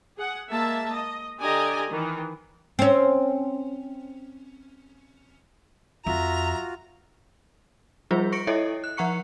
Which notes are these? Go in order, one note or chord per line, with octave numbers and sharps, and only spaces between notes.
G#4 F#5
G#3 A#3 E5 A5
D#5
D3 G4 D5 D#5 G#5 A#5
D#3 E3
C4 C#4
F2 F4 F#4 E5 A#5
F3 G3 F4 G#4 C5
C#6 A#6 C#7 D7
E4 A4 C#5 D#5 E5
F#6
F3 F#5 A#5 C#6 C#7